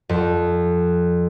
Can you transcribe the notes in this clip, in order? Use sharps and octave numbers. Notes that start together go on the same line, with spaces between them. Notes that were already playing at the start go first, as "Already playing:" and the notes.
F2